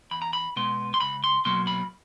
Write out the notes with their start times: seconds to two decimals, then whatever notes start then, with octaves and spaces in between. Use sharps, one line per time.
0.11 E2 B5
0.22 A#5
0.33 B5
0.56 B2 G#3 B3 C6
0.94 C6
1.00 C#2 B5
1.24 C6
1.45 B2 F#3 A#3 C6
1.67 B5